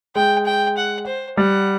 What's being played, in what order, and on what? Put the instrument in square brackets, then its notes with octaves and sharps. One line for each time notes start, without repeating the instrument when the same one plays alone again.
[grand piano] G#3 [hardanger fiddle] G5
[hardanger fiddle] G5
F#5
C5
[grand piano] G3 [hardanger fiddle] F#5